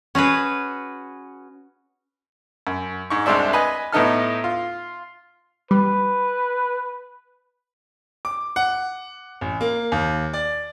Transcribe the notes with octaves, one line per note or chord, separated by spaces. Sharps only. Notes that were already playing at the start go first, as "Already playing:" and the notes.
C#4 F#4 G#4 B4
F#2
G#2 C#6
C2 G#3 C4 D4 E5
B4 D#5 G#5
A2 B3 D#4 A4 F6
F4
G3 B4
D6
F#5
A1
A#3
D#2
D5